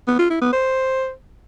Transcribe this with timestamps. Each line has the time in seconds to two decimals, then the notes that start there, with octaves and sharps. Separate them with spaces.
0.07 B3
0.19 F4
0.30 E4
0.41 B3
0.53 C5